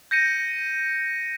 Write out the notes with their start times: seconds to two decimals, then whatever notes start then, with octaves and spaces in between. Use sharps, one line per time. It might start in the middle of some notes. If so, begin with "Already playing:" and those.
0.11 G6 A#6 C#7 D#7